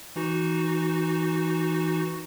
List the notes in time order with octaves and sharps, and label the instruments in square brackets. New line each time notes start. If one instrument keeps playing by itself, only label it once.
[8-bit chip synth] E3 D#4 F#4